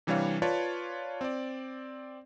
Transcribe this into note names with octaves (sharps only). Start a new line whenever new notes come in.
C3 E3 G3 D4 C#5 F5
F4 B4 C#5 D5 A5
C4 D5